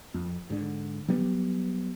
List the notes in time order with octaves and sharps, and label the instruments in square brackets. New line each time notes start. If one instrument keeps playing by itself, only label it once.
[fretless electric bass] F2
G#2 D3
F#3 G3 B3